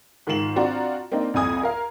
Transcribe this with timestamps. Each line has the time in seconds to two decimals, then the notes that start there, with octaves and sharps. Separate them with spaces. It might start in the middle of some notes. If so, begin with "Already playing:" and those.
0.27 G#2 D#3 F4 C7 E7 F#7
0.56 C4 D4 F4 F#4 D5 A#5
1.12 A#3 C4 D4 D#4
1.34 C2 F2 G#5 D#6 G#6
1.63 A#4 F5